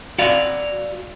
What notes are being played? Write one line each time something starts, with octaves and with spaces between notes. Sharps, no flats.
F#4 D5 F5